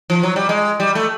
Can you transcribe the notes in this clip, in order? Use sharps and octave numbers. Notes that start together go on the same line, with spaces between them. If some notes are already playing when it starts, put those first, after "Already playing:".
F3
F#3
G3
G#3
G3
A3